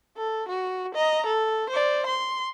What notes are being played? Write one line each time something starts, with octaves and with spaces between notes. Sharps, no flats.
A4
F#4
D#5 A#5
A4
C5 D5
C6